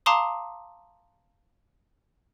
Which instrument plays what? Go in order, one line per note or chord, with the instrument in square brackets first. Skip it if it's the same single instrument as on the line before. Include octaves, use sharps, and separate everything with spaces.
[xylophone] F5 A5 A#5 C6 D6 D#6